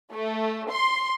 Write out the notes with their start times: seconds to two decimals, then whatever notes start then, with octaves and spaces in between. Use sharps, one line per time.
0.13 A3
0.70 C6